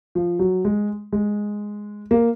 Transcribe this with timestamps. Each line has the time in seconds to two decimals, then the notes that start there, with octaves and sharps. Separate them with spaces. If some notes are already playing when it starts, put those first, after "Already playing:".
0.15 F3
0.39 F#3
0.65 G#3
1.12 G#3
2.11 A#3